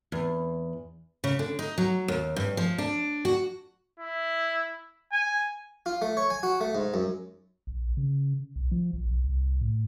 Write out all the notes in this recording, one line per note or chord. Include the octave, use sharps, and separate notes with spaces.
E2
C#3
D3
D#4
F#3
D#2
G2
F3
D4
F#4
E4
G#5
F4
A3
C#5
G#5
F#4
A3
G#2
F#2
A#1
C#3
B1
F3
A#1
B1
C2
A2